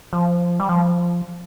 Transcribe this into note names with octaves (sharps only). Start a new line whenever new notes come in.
F3
G3
F3